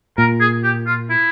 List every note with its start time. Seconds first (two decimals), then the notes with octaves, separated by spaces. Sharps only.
0.18 A#2 A#4
0.40 G#4
0.64 G4
0.87 F4
1.10 E4